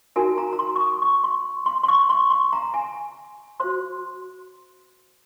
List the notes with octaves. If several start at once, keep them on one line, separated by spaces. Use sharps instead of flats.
D#4 F#4 A#4 G#5
A#5
A#5
C6
C#6
D#6
C#6
C6
C6
C6
C#6
C6
C6
A#5
G#5
F#4 C5 C6